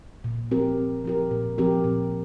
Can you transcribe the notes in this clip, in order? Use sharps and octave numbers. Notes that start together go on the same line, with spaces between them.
A#2
F3 C4 G4 A#4
A#2
F3 C4 G4 A#4
A#2
F3 C4 G4 A#4
A#2